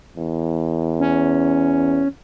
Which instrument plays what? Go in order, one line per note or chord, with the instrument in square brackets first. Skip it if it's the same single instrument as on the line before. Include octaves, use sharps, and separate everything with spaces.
[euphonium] E2
[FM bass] C#4